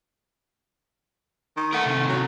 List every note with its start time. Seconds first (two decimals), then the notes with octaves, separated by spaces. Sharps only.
1.57 D#3
1.73 A3 A#4 F#5
1.86 C3 D#3
2.09 F#3